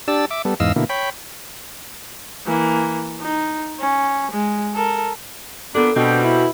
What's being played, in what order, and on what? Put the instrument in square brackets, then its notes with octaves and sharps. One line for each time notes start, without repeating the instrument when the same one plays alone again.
[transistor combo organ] D4 G4 D5 A5 E6
E5 D6
G3 B3 A4
E2 G#2 D#5 F5 E6
B2 D3 A#3 E4
C#5 G5 B5
[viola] E3 A#3
D#4
C#4
G#3
A4 A#4
[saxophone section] A#2 D4 [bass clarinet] B3 [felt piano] A4
[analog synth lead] B2 [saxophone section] G3 C4 [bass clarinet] D4
[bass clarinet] E4